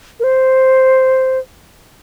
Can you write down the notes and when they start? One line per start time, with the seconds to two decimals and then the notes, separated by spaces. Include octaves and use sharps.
0.20 A#4
0.24 C5